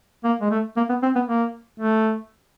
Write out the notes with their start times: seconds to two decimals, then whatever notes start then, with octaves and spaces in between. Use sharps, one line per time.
0.24 A#3
0.41 G#3
0.51 A3
0.77 A#3
0.89 B3
1.02 C4
1.15 B3
1.28 A#3
1.80 A3